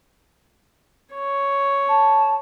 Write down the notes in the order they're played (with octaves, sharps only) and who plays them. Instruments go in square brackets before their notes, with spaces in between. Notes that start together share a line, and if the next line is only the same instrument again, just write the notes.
[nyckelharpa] C#5
[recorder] A5